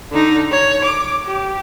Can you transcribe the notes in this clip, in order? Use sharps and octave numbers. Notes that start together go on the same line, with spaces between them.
D3 D#4
C#5
D6
G4